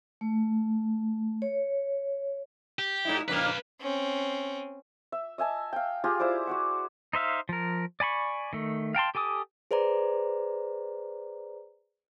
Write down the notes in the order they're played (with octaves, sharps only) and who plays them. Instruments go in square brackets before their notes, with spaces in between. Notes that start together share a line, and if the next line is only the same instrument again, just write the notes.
[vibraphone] A3
C#5
[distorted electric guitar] G4
[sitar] G#2 D#4 E4
[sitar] F2 C#3 A#3 [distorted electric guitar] B4 F5
[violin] C4 C#4
[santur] E5
D#5 E5 G#5 A5
F5 G5
F4 G4 G#4 A#5
E4 C5 D5 D6
F#4 D5 F#5
[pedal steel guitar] D#4 C5 E5 F5
F3 A#4
D5 G#5 B5 C#6
D#3 A3
F5 G5 A5 C6
G4 A4 G#5 D6 D#6
[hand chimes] G#4 B4 C5 D5 A#5